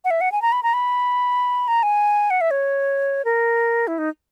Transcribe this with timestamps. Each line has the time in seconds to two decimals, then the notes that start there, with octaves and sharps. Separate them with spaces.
0.05 F#5
0.11 E5
0.21 F#5
0.32 G#5
0.42 A#5
0.52 B5
0.63 A#5
0.74 B5
1.68 A#5
1.83 G#5
2.30 F#5
2.41 E5
2.51 C#5
3.25 A#4
3.87 E4
3.98 D#4